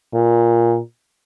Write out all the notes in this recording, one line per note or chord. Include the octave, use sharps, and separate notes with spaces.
A#2